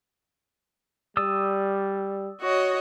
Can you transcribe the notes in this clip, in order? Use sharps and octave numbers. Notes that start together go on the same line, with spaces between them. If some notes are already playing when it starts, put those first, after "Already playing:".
G3 D5 D#6 E6
F#4 C#5 D#5